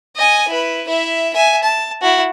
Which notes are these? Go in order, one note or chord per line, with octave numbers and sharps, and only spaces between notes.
D#5 G#5
E4 B4
E4 E5
E5 G#5
A5
E4 F#4